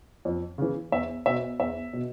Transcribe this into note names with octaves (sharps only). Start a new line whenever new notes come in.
F2
C#3 E3
E2 E5
B2 E5
E2 E5
B2